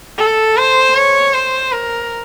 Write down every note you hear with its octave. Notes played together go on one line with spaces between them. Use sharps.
A4
C5
C#5
C5
A#4